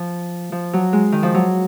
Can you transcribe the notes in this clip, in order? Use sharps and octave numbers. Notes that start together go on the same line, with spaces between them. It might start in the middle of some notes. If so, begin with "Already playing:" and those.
Already playing: F3
F3
F#3
G#3
D#3
F3
F#3